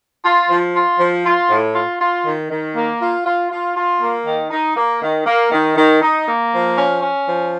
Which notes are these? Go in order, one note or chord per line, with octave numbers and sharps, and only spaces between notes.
F4
F3
F4
F3
F4
A2
F4
F4
D#3
D#3
A#3
F4
F4
F4
F4
A#3
D#3
D#4
A#3
D#3
A#3
D#3
D#3
D#4
A#3
F3
C#4
C#4
F3